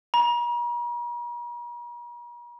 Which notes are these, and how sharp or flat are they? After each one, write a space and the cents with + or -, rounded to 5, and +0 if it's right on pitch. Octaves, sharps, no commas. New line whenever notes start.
A#5 +45